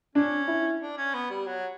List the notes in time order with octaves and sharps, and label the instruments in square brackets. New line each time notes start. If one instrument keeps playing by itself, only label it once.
[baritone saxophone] C#4 [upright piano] D4
[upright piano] E4
[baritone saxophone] D4
C#4
B3
G3
F#3